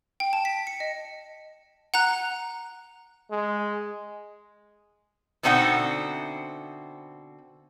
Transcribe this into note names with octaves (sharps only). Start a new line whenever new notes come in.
G5
A5
B6
C#7
D#5
F#5 A#5 F#6
G#3
B2 D3 C4 D#4 E5 F#5